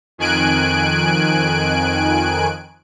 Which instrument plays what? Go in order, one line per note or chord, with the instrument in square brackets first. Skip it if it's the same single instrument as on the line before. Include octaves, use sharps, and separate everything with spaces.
[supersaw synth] F2 D#3 G#5 F#6 D7